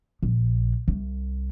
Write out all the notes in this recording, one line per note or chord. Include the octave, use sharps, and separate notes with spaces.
A#1
C2